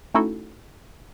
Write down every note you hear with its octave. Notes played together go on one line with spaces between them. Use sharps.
A3 C#4 D#4 E4 F#4 A4